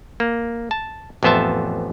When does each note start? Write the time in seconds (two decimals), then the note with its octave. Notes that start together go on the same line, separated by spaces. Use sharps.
0.20 A#3
0.71 A5
1.23 A1 F2 B3 C5 E5 A5